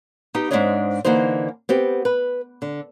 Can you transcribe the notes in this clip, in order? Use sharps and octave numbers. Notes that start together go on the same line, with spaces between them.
B3 D#4 G4
G#2 A#3 C4 D4 C#5 D#5
D3 E3 A#3 D#4 C5
B3 C4 G4
B4
D3